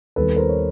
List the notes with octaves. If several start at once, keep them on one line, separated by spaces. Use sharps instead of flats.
D#2 D#3 G3 B3 A4 B4
A#4 C5
C#5